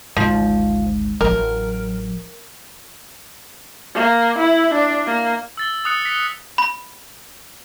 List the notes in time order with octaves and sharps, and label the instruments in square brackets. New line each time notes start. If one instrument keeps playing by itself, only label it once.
[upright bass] G#1 D2 [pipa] F3
[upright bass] A1 F#3 [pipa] A#4
[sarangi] A#3
E4
D4
A#3
[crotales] E6 A6 G7
D#6 F#6 C#7
B6 C#7 G7
[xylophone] B5